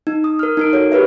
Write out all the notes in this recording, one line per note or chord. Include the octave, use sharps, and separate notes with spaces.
D#4
D#6
A#4 F6
D#4 A#4 D7
F#4 A4 C#5
G4 A#4 B4 E5